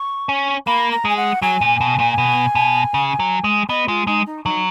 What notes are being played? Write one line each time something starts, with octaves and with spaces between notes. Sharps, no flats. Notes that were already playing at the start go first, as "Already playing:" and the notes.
Already playing: C#6
C#4
A#3 B5
A#5
G#3 G#5
F#5
F#3 G#5
A#2
B2
A#2
B2
B2
C#3
F#3
G#3
B3 D#5
G#3 F4
G#3 D#4
D#4
F#3 D#4